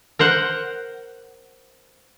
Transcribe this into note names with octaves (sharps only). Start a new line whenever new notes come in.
A#4 C5 F#5